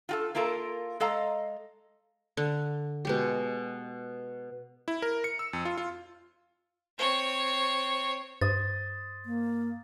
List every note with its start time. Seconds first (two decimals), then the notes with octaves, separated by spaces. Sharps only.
0.09 F4 F#4 A4
0.35 A#3 E4 F4 A4 A#4
1.00 G#3 A4 D#5 F5 A#5
2.37 D3
3.05 B2 G#3 G4
4.88 E4
5.02 A#4
5.24 C#7
5.39 E6
5.53 F2
5.65 F4
5.78 F4
6.98 C4 C#5
8.41 G2 C5 D#6 A6
9.26 A#3